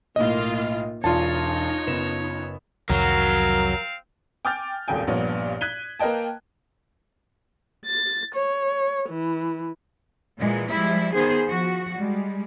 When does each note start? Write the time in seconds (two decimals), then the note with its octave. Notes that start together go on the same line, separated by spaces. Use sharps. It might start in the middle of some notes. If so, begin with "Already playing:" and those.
0.16 B1 A2 A#3 F4 D#5
1.04 E1 E2 D#4 F4 C#5 D5 A5
1.87 F#1 B3 E7
2.90 C2 F2 D#3 F#3 C4 A#4 F5
4.45 G5 G#5 D6 F6 G6 A6
4.88 D#1 G#1 C#2 A4 G5 G#5
5.07 A#1 G2 A#2 B3 C#5
5.61 F#6 G#6 B6 D#7 G7
6.00 A#3 A#4 B4 D#5 G5 A5
7.86 A6
8.35 C#5
9.09 E3
10.37 A#2 E3 G#3
10.70 F3 G3 G#3 E4
11.14 D#3 B3 G#4 C5
11.44 F3 F#4
11.97 G3 G#3